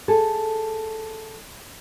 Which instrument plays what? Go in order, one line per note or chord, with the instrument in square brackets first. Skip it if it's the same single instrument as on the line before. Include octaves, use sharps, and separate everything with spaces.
[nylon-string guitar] G#4 A4